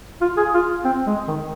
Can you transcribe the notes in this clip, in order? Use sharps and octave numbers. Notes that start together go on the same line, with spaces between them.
F4
G#4
F4
C4
G#3
D#3